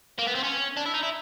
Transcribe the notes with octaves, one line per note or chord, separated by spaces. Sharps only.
A#3
B3
C4
C#4
D4
E4
D#4
E4